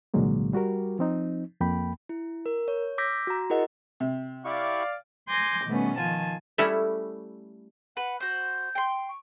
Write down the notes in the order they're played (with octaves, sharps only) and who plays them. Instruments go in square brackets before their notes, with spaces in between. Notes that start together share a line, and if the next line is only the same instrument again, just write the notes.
[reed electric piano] C2 A#2 D3 F#3 G#3 A#3
G3 F#4 G4 A#4
F3 C4 D#4
F2 A#3 G5 B5
[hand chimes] E4
A#4
C#5
D6 E6 G6 A#6 B6
F#4 A#5
E4 F#4 G#4 A#4 D#5 F#5
[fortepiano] C3
[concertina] E4 G4 C#6 [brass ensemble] D5 F5
[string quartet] G#5 C6 D6 G6 A#6
B2 D#3 G3 A3 B3 C#4
D#3 F3 F4 G#5 A5
[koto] G3 A3 C#4 E4
[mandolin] B4 [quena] F#5
[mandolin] F#4 C5 [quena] G6
[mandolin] G5 C6
[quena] C#6